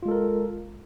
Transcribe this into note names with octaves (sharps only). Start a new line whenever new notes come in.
G#3 F4 A4 A#4